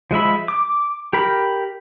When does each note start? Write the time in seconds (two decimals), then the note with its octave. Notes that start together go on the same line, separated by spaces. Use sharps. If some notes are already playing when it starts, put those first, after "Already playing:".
0.11 F3 G#3 E5 B5
0.48 D6
1.13 G4 A#4 B5